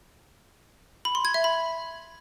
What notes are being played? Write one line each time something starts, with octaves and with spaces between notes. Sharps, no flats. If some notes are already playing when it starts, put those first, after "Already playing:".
B5
C6
G#6
E5
B5